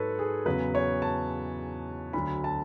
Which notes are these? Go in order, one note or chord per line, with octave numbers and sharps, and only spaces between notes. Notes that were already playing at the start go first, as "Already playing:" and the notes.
Already playing: G#2 F#3 A4 B4 C#5
G#4
E2 C#3 F#3 B4
C#5
A5
D2 D3 F#3 B5
A5